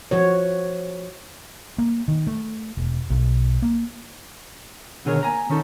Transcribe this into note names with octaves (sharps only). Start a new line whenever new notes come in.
F3 F#4 C#5
A#3
D#3
A3
E1
B1
A#3
B2 D3 D#3 G#4 A#4 C#5
A#3 G#5 A#5
D#3 C#4 D#4 A4